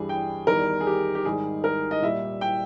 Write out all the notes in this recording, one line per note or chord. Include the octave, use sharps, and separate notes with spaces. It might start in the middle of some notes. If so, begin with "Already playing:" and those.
Already playing: G2 E3 G3 G#4
G5
E2 D#3 G3 A#4
G#4
G4
G4
G#2 D#3 G3 G#4
A#4
D#5
A#2 G3 E5
G5